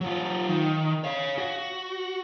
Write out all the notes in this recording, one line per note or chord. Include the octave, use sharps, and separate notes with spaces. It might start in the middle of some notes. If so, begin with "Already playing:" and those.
F#3 F4
D#3
C#5 F5
F#4